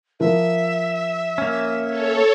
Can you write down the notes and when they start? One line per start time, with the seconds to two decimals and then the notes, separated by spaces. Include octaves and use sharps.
0.20 F3 A#4 E5
1.38 A#3 C#4
1.89 A4 C#5